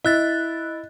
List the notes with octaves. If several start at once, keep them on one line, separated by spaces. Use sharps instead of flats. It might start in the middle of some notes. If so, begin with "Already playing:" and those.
E4 D#5 F#6 A6